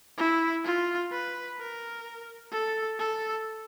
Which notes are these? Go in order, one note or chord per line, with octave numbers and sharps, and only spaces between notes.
E4
F4
B4
A#4
A4
A4